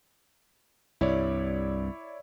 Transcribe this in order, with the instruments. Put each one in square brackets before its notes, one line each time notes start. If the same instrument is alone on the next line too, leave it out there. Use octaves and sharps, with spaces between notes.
[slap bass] C2 G2 [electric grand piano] E4 C#5 D5